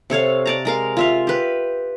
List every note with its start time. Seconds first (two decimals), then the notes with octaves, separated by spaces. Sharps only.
0.10 C3 A4 C#5 F5
0.46 D5 A5 A#5
0.65 G#3 A#4 F5
0.97 F4 E5 F5
1.27 G4 B4